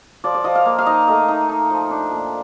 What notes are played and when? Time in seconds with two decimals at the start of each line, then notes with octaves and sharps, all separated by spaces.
0.24 F3 D5
0.35 D5
0.44 F3 D#5
0.55 F5
0.65 A#3
0.78 F5
0.86 D#4 D#5
1.07 A3 D#5
1.28 D#4
1.49 D#4
1.70 F3
1.91 D4
2.12 A#2